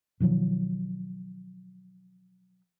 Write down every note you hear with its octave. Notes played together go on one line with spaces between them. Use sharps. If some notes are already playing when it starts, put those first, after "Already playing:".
B2 D#3 F3 F#3